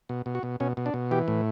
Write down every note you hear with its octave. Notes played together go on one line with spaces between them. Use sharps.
B2
B2
F#4
B2
B2 C#4
B2
D4
B2
E3 G4
A2